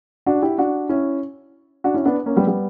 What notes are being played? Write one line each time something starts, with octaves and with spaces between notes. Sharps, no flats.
D4 F#4
E4 G4
D4 F#4
C#4 E4
D4 F#4
C#4 E4
B3 D4
A#3 C#4
G3 B3
G3 B3